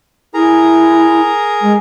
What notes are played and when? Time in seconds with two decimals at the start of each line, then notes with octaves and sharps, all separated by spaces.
0.34 E4 G#4 A#4 A#5
1.61 G#3